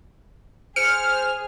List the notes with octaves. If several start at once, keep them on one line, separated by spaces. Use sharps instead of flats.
G#4 C5 F6 C#7